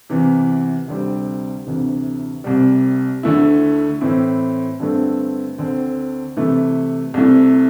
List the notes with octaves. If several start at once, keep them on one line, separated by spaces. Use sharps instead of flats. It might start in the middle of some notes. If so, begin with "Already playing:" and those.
E2 C3 E3
D2 C3 G3 C4
D2 C3 E3
C2 C3 G3
D2 D3 A3 E4
A2 E3 C4 E4
G2 D3 A3 C4
D2 D3 C4
C3 E3 A3 E4
C2 C3 A3 E4